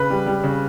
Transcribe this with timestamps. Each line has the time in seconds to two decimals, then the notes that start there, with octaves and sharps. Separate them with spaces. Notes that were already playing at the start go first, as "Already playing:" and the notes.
Already playing: C#3 B4
0.10 G3
0.26 G3
0.44 C#3